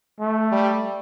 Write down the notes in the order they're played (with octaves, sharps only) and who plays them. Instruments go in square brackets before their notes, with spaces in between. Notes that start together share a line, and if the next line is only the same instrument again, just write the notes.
[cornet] A3
[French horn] G3